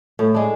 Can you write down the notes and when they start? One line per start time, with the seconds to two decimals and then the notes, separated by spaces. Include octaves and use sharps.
0.19 A2
0.34 G#3 D4